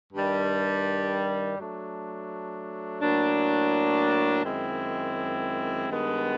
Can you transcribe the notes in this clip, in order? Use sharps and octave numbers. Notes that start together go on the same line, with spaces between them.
G2 D#3 G3
F#3 A3 D4
A2 F#3 A#3 D4
F#2 D#3 G#3 C4 E4
G2 D#3 G#3 B3